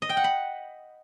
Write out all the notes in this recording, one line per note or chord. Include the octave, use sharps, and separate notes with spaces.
D#5
G5
F#5
B5